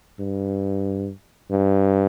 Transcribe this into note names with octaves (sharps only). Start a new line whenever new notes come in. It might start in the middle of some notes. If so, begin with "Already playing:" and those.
G2
G2